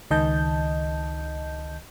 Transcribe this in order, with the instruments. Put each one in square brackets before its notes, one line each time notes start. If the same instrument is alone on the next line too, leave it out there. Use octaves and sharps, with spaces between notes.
[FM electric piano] C#2 D#3 D#5 A5 G6